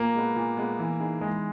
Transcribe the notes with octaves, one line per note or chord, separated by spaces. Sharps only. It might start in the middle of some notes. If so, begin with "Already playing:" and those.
Already playing: A#2 A#3
G#3 B3
A#2
G#3 B3
E3
B3 D#4 G#4
E3 G#3